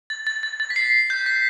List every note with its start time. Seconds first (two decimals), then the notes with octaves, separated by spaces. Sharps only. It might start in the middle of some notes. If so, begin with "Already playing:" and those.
0.10 A6
0.27 A6
0.43 A6
0.60 A6
0.70 B6
0.76 C7
1.10 G6
1.26 B6